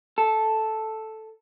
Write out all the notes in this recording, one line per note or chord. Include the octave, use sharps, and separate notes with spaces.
A4